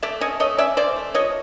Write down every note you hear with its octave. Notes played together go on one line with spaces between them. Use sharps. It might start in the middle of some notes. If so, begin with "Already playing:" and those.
A3 D5 E5
C#4 C#5 D#5
A3 C#5 D#5
C#4 D5 E5
C#4 C5 D5
A3
F3 C#5 D#5